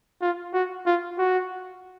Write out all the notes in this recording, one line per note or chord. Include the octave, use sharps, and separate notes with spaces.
F4
F#4
F4
F#4